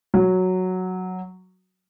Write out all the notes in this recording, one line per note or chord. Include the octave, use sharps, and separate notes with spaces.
F#3